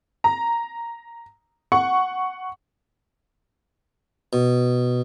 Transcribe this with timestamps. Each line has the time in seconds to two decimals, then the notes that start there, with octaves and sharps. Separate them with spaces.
0.24 A#5
1.72 F#5 C#6
4.33 B2